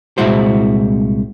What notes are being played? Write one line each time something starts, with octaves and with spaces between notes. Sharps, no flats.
C2 A#2 G#3 E4 F#4 C5